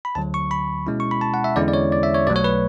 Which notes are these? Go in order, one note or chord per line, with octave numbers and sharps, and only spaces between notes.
B5
D2 D3 F#3 A5
C#6
B5
B2 G#3 C#4 E4
C#6
B5
A5
F#5
E5
E2 D3 G#3 C#4 E4 D5
D5
C#5
D5
E5
C#5
B1 B2 F#3 A3 D5
C#5
B4